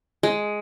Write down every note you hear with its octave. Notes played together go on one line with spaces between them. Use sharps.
G#3